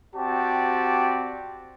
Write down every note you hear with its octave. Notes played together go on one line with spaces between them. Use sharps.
C4 F#4 G4 D5 A5